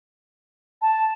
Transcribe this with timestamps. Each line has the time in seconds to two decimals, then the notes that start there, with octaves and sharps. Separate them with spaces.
0.82 A5